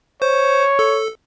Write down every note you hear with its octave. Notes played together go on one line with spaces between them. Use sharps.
C5 C#5
A4